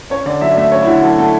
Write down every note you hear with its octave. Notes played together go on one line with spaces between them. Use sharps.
C#4 C#5
D3 D5
F#3 E5
D5
A3 E5
C#4 C#5
E4
D3 F#4
F#3 A4
A3 A4